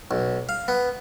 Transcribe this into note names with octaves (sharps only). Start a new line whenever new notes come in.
B1
F5
B3